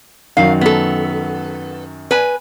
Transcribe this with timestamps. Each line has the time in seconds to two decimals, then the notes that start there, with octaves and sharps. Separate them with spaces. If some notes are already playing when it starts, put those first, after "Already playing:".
0.37 F#2 D#3 F#3 F5
0.61 B3 A4
2.11 B4 G#5